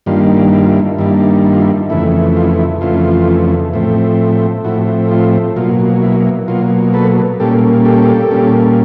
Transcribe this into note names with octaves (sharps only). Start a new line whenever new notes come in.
G2 D#3 G3 A#3 D4 F4
E4
F4
E4
G2 D#3 G3 A#3 D4 E4
E4
F4
E4
F2 C#3 E3 A3 E4
F4
E4
E4
F2 C#3 E3 A3 F4
A2 F3 A3 C4
A2 F3 A3 C4 E4 F#4
F4
B2 F#3 A#3 F4
E4
B2 F#3 A#3 F4
A4 B4
A#2 G3 A#3 C#4 G4 A4
G4 A4
A#2 G3 A#3 C#4